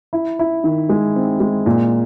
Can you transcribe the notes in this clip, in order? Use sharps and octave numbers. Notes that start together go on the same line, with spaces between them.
E4
E4
D#3
G#3
C4
G#3
A#2